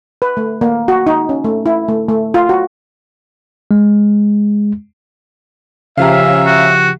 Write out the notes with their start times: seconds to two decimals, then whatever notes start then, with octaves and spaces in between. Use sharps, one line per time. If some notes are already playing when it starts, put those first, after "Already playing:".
0.22 B4
0.37 A3
0.61 A#3
0.88 F#4
1.07 D#4
1.29 C#4
1.44 A3
1.66 E4
1.88 A3
2.09 A3
2.34 F4
2.49 F#4
3.71 G#3
5.98 C#3 F3 C#4 G4 E5 F5 A#5
6.46 F#4